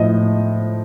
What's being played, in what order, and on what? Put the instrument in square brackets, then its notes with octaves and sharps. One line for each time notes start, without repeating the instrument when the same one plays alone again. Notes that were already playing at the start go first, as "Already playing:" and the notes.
Already playing: [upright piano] A2 F3 D#5